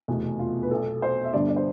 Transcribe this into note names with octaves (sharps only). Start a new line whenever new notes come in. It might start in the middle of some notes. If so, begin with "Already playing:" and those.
F1 E2 B2
F4
B4
B1 B2 A4
C5
E5
G1 G2 D3 D5
D5
C5